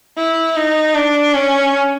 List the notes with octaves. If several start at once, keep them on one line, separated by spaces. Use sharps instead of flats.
E4
D#4
D4
C#4